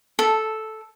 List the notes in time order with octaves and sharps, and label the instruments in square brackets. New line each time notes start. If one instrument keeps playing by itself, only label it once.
[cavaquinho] A4